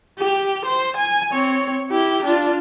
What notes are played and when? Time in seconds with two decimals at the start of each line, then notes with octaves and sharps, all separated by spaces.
0.19 G4
0.66 C5
0.97 G#5
1.32 C4 C#5
1.89 E4 G4
2.25 D4 F4